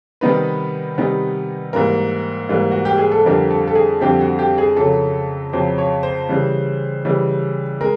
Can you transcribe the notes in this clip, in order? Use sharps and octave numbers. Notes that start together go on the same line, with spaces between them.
C3 D#3 G3 B3 D#4 B4
C3 D#3 G3 B3 D#4
G#2 E3 G3 A#3 A#4
G#2 E3 G3 A#3
F#4
G4
G#4
A4
F2 D3 G3 C4 A#4
A4
A4
G#4
F2 D3 G3 C4 G4
F#4
G4
G#4
F2 C#3 F#3 A4
F2 C#3 F#3 C5
C#5
C5
C#3 E3 G3
C#3 E3 G3
G#3 A#4